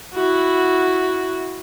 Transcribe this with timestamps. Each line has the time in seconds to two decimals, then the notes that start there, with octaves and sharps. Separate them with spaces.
0.14 E4 F#4